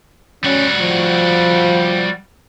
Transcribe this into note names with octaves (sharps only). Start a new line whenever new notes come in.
G3 C#4 F#4
F3